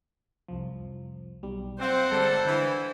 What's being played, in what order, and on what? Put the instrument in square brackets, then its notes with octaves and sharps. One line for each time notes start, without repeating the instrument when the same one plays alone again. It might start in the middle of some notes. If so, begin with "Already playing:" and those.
[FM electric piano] C2 F2 F3
B1 G3
[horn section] C4 [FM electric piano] F4 D5 [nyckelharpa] C5 F#5
[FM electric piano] G1 G#3 A#5 [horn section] G3 A4
[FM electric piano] D3 [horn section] E3 E4